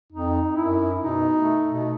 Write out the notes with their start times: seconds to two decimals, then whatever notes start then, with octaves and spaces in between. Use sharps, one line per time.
0.12 F2 D#4
0.55 F#2 E4
1.01 B2 D#4
1.35 A3
1.69 B2